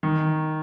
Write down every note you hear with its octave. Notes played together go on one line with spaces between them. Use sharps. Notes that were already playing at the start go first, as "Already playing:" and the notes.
D#3